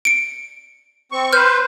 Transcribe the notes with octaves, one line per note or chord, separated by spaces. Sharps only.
C#7 D7
C4 C#6
B4 C5 F6 G6